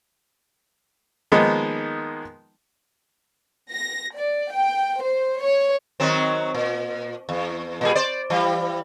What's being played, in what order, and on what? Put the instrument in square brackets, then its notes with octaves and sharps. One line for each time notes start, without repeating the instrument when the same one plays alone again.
[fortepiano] D#3 F3 G#3 A#3 B3 D#4
[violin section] A#6
D5
G5
C5
C#5
[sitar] D#3 F#3 C4
A#2
E2
A#2 G3 G#4
C5 D5
E3 G3